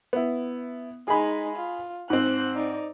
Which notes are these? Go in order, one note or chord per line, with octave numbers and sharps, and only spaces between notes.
B3 E4
G#3 D#4 G#4 B5
F4
G#2 C4 C5 F#6
D#4 D5